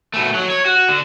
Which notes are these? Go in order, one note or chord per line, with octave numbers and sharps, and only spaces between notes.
B2 A3
F#3
C#5
F#4
D3